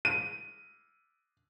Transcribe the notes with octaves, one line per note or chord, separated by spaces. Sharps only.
D#7